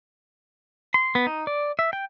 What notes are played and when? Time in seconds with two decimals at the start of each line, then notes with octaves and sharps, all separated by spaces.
0.94 C6
1.15 B3
1.27 D#4
1.47 D5
1.79 E5
1.93 G5